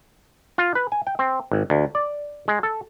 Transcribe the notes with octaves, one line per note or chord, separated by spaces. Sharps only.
F4
B4
G#5
G5
C4
G#1
D2
D5
G#3
A4